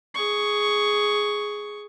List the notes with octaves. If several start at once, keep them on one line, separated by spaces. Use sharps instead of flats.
G#4 C#6